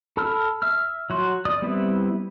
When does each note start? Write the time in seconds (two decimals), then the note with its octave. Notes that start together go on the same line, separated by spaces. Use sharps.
0.17 A4 A5 B5 E6 F6
0.62 E5 E6 F6
1.10 F#3 F#4 C6
1.45 D5 D#6
1.62 G3 B3 C4 E4 B4